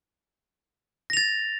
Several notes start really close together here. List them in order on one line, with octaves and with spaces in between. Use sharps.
A#6 F7 A6